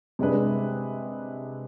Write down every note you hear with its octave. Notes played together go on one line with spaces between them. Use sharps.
C3 G#3 D4 G#4 B4